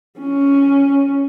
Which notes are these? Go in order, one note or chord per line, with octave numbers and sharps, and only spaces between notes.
C#4